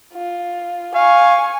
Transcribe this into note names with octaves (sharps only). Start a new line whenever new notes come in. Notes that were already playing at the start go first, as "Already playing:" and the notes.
F4
F5 G#5 C#6